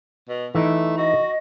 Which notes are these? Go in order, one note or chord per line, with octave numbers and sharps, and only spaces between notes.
B2
E3 A3 D#4
F#4 D#5